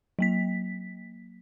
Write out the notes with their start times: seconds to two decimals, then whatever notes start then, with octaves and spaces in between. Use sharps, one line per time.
0.19 F#3 A#3 B6